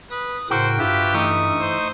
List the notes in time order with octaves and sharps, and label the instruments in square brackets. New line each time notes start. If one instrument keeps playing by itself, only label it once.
[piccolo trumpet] B4 [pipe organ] D#6
[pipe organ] A2 C#3 [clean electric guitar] F#4 [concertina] A#4 G5 [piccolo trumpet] C5
[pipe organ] G2 [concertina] F4 B4 E5 [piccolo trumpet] G4
[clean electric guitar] E3 A3 [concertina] D#4 C#6 D#6
[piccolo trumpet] C5